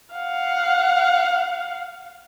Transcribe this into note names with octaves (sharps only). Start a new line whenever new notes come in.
F5 F#5